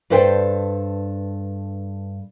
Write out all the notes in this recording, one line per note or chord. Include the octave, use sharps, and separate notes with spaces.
G2 A4 B4 C5 G5